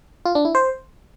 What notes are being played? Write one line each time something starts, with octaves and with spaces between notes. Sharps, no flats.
F4
D4
E4
C5